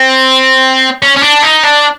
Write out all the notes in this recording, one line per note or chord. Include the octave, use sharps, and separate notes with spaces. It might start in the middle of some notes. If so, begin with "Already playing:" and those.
Already playing: C4
C#4
C#4
D4
D#4
D4